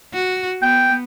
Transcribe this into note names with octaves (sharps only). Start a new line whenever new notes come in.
F#4
B3 G5